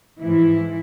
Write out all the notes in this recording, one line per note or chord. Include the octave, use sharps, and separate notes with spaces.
G#2 E3 F3 E4